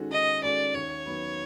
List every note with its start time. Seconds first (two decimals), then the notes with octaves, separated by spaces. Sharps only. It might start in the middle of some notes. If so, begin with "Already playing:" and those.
Already playing: D#3 G#3 C#4 F#4 A4
0.12 D#3 D#5
0.43 G#3 C#4 F#4 A4 D5
0.74 D#2 C#5
1.06 D#3 F#3 B3